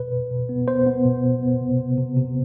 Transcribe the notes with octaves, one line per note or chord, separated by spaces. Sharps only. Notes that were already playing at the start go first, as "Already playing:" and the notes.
Already playing: B2 B4
B2
B2
B3
B3 C5
B3
B2
B2
B3
C3
C3
C3
C3